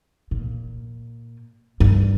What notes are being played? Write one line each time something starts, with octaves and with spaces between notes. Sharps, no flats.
A#2
G2